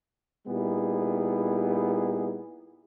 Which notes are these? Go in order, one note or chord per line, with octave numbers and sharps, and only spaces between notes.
A#2 G3 B3 D#4 E4 G#4